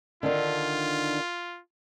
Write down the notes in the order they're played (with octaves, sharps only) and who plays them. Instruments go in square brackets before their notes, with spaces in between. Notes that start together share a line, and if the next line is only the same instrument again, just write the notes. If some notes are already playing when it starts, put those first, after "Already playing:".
[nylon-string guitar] D3 D#3 D4 [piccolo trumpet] F4